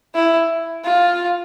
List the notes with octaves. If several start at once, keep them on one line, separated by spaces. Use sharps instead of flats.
E4
F4